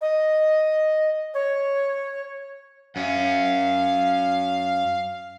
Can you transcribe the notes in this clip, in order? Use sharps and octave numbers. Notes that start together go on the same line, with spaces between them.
D#5
C#5
F#2 C#4 F5